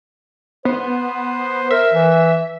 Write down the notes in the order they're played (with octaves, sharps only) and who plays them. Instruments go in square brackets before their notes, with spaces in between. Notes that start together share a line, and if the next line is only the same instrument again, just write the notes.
[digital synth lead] B3 [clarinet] C5
[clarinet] A#4 [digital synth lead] E5
[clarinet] E3